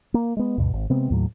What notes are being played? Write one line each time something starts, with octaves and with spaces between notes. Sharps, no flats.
A#3
G#3 B3
D2 G2 B2
G#1
C3 G#3 B3 C4
D#2 A2 F#3